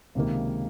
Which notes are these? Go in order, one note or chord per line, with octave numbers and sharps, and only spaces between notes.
C#2 C3 D#3 A#3